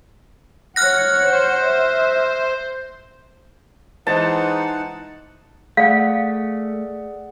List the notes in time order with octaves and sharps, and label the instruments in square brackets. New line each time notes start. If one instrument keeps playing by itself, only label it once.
[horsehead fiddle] C#5 F#5 [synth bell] F6 F#6 A#6
[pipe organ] C5
[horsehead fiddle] E5
[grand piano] E3 G#3 C5 [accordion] D#4 F#5 [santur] A5
[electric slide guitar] A3 [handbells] G#4 D5 F#5 [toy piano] F5